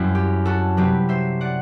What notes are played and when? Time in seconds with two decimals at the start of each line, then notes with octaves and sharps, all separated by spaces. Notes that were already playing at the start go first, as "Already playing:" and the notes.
Already playing: F#2 F#3 C4 E4
0.15 G4
0.45 F#4 A4
0.77 C3 F#3 C4 G4 B4
1.09 C5 E5
1.41 D5 F#5